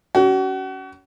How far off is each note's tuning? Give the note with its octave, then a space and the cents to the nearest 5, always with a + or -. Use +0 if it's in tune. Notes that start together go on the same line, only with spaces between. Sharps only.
C#4 +30 F#4 +35